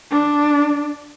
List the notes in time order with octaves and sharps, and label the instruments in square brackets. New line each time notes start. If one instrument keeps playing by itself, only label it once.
[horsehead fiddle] D4